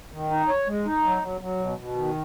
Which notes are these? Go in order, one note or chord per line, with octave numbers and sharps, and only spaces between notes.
D#3
D#4
C#5
G#3
D#4
F#3
F#3
F#3
B2
B2
D#3